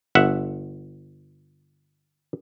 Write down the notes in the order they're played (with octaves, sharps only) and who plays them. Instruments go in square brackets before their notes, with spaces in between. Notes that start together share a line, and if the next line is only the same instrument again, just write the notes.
[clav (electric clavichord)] G1 E5 F#5